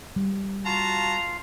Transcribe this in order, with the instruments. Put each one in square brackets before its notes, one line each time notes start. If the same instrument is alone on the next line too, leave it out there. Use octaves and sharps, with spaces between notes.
[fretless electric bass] G3
[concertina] F4 F5 [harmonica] F#4 A5 A#5